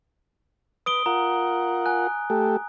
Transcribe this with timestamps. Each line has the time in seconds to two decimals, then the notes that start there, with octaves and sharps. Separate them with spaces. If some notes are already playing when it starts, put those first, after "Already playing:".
0.86 B4 D#6 D7 G7
1.06 F4 A#4 F#5 A#5
1.86 G#5 F#6
2.30 A3 G4 A4